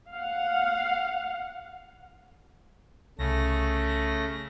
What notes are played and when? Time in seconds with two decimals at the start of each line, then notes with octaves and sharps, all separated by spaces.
0.11 F5 F#5
3.19 C2 C#3 A3 A#6